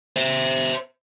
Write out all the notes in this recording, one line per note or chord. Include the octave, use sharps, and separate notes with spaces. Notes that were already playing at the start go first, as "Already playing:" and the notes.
C5 E5